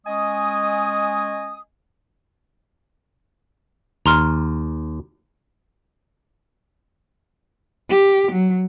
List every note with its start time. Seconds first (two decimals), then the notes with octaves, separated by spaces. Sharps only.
0.07 G#3 C#4 D#5 G#5 D#6
4.06 D#2 A#5 C6 F6
7.90 G4
8.32 F#3